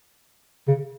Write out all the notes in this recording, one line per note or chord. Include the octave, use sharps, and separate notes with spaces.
C#3